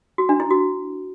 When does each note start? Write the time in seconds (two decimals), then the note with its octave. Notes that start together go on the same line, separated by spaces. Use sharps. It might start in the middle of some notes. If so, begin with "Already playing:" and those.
0.18 F#4
0.29 D4
0.40 E4
0.51 F#4